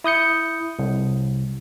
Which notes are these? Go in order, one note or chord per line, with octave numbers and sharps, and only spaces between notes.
E4 D#6 G6 C#7
C2